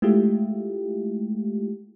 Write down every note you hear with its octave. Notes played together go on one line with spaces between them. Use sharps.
G#3 A3 E4 F4 G4